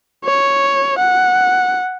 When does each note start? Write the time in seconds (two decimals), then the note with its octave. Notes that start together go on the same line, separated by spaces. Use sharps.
0.25 C#5
0.98 F#5